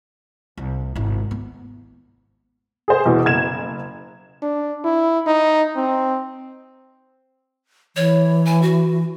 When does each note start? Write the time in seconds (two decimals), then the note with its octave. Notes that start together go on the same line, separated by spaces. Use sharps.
0.58 C2
0.95 G#1 E4
1.31 B3
2.88 G#4 C5
3.05 E2 B2 E3
3.25 F#1 G#6 E7
4.42 D4
4.84 E4
5.27 D#4
5.76 C4
7.96 E3 C#5
8.46 G#5
8.62 F#4